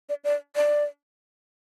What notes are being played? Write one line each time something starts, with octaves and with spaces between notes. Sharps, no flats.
D5
D5
D5